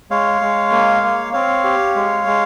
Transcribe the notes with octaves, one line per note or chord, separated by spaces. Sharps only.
G#3 C#5 F5
G#3
A#3
A#3
C4 C#5 F5
G4
G#3
G#3